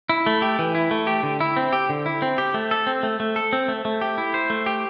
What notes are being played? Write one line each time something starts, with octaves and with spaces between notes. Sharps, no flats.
E4
A3
G4
E3
E4
A3
G4
D3
E4
C4
G4
D3
E4
C4
G4
A3
A4
C4
A3
A3
A4
C4
A3
A3
G4
E4
C5
A3
G4